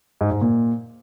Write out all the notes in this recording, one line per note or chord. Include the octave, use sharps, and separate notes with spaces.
G#2
G#2
A#2